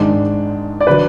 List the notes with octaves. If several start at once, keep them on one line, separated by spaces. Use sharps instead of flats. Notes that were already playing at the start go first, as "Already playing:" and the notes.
Already playing: G#1 G#2 D#3 G#3 D4
D5
D3 F#3 B4